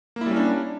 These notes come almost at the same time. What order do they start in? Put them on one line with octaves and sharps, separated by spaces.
A#3 E4 G3 C#4 D4